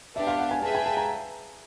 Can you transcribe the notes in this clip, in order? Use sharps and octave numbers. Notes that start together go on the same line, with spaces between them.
B3 D4 G4 E5
F5
F#5
G#5
G#4 B4 E5 G5 A5
G#5
A5
A#5